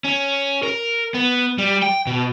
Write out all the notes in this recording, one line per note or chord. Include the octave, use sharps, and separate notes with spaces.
C#4
A#4
B3
G3
G5
B2